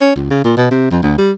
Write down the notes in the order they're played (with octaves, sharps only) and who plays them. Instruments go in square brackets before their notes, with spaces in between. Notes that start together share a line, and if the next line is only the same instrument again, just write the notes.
[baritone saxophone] C#4
C#2
C#3
A#2
B2
C3
F2
D2
G3